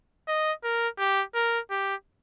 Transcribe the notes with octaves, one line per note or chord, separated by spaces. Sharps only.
D#5
A#4
G4
A#4
G4